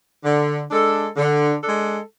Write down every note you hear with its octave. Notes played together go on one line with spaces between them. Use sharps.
D3
G#3 D4 A4
D3
G#3 D4 A4